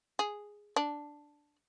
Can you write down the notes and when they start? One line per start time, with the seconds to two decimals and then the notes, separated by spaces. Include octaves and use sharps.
0.19 G#4
0.76 D4